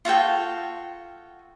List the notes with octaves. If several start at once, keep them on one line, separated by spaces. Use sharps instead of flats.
F4 F#4 A4 G5